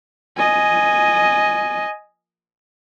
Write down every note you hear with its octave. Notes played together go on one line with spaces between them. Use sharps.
D#5 G#5